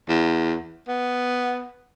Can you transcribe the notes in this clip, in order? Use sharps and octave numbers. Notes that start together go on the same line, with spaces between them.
E2
B3